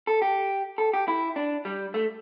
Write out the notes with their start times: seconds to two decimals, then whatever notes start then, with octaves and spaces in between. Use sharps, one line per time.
0.07 A4
0.22 G4
0.78 A4
0.93 G4
1.08 E4
1.36 D4
1.65 G3
1.94 A3